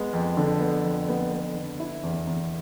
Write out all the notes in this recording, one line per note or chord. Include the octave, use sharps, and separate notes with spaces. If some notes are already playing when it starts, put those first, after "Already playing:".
Already playing: G#3 B3
F2
D3
B3
F2
B3
B3
D3
E4
E2
E2